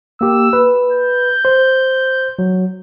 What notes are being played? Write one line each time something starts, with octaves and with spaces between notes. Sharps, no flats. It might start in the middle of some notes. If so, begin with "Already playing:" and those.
A#3 G4 E6
B4
G6
C5
F#3